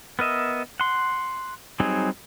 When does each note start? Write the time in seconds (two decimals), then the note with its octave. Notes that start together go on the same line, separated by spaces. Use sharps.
0.19 B3 A#4 D#5 E5
0.80 F#5 C6
1.80 F#3 G3 C4 D#4 G#4